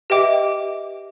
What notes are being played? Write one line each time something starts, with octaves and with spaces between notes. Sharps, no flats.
G4 B4 D#5 E5 G5 D6